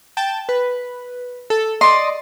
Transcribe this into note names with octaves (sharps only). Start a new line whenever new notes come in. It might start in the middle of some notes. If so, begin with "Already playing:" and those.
G5 A5
B4
A4
D5 D#5 C6